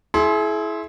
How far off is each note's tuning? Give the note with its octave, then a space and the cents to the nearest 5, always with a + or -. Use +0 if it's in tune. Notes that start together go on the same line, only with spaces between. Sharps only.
E4 +0 G#4 +40 C6 +0